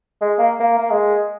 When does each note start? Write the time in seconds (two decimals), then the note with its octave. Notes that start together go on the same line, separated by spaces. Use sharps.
0.21 G#3
0.39 A#3
0.60 A#3
0.79 A#3
0.91 G#3